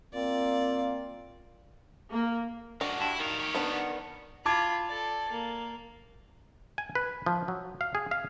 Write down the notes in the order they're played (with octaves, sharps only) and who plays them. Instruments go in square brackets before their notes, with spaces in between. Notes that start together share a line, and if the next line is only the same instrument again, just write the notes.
[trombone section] A#3 F4 [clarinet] C4 [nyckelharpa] D5
[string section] A#3
[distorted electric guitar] G#3 A#3 [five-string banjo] D4 F#4
[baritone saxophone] G2 [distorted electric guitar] E4
[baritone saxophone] D#3 [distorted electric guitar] G3 F5
[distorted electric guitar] G4 C#5
[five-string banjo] B3 D4 F#5
[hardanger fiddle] F4 B5 [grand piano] A5 D6 G#6
[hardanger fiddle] A4 D5
A#3
[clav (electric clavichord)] G#5
B4
F3
F#3
F5
G#4
F5